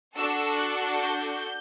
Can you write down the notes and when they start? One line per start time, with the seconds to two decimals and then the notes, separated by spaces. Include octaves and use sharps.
0.16 D4 F#4 A4 E6
0.57 F#6
0.96 G6